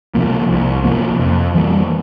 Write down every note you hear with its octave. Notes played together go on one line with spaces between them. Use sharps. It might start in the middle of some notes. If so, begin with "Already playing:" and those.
C3 F3 A#3
C2
C3 F3 A#3
F2
E3 G3 A#3